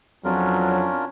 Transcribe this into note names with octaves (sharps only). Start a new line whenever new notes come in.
F2 F#3 C#4 D4 F4 A#4